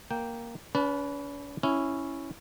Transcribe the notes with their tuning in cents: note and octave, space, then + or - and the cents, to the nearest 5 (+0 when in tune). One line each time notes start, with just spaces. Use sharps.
A#3 +0 G5 +0
C#4 +45 B4 +0 A5 -15
C#4 +0 E4 +0